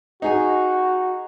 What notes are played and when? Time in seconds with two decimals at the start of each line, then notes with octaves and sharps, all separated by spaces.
0.22 D#4 F#4 G#4 G#5